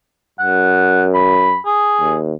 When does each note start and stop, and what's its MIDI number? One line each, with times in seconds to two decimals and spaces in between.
0.39 1.57 42
0.39 1.04 78
1.15 1.59 83
1.66 2.16 68
2.00 2.33 39